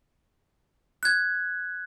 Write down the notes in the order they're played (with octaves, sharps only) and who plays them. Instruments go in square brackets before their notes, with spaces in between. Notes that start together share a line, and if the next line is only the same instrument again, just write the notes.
[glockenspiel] F#6 G#6